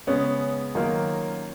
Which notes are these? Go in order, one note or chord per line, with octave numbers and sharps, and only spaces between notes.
C#3 G#3 B3 C#4
D#3 F#3 A#3 F4 A#4